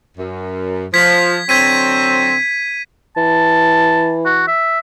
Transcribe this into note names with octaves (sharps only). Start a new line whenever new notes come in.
F#2
F3 G#6 B6
D3 F#3 C4 G#6 B6 D#7
E3 A5
F#4
E5